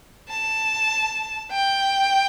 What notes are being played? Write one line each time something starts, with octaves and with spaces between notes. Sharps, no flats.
A5
G5